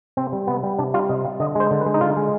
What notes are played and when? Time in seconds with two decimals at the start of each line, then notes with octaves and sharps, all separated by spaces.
0.17 C3 C4
0.33 G3
0.47 C3 B3
0.63 G3
0.78 C3 D4
0.94 G3 F4
1.09 C3 D#5
1.24 G3 F5
1.40 D3 D#5
1.55 G#3 C5
1.71 D3
1.81 B4
1.86 G#3
1.94 D#4
2.01 D3 F4
2.17 G#3